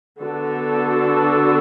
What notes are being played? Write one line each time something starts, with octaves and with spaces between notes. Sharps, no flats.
D3 B3 D4 F#4 A4